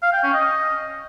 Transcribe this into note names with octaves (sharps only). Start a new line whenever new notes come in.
F5
G5
C#4
D#5